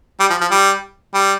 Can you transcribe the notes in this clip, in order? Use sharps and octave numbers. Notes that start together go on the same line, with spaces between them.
G3
F3
F3
G3
G3